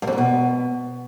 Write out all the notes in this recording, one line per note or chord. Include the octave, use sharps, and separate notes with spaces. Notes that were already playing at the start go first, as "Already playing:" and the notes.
G2
F2
G#2
B2